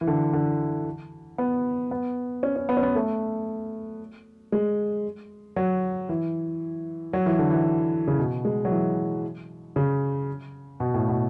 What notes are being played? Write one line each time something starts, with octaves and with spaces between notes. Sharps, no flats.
E3
D3
D3
B3
B3
C#4
C#4
B3
C#4
B3
A3
G#3
F#3
E3
F#3
E3
D3
E3
C#3
B2
G#3
F#3
E3
C#3
B2
A2
B2